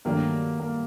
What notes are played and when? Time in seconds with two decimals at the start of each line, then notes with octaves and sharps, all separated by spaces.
0.05 G2 D#3 F#3 A3 A#3 D4
0.60 A#3